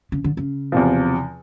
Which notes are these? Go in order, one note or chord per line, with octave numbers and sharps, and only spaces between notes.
C#3
D3
C#3
E2 C3 F3